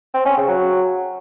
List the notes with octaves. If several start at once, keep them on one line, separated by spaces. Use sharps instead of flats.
C4
C#4
C#3
F#3